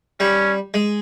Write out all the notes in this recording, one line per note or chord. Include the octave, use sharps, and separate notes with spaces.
G3 C#4
G#3